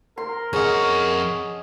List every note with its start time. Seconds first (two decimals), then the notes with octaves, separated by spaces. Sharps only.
0.18 A#4 C6
0.53 F2 C#4 G#4 D#5 F#5